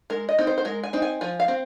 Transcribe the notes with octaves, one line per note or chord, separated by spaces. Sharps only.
G#3 A#4
D#5
C4 D#4
C5
C5
G#3 A#4
G#5
C4 D#4
G#5
F3 G#5
F5
C4